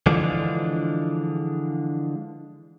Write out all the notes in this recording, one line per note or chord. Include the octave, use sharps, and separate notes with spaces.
D3 E3 F3 G#3 D4 F4